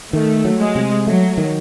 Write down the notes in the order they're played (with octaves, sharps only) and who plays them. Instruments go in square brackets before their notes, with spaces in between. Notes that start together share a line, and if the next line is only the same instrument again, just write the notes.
[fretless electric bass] D#3 [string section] A3
[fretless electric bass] F#3
[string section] G#3
[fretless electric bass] C3
[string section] F#3 [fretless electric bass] A3
[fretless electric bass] D#3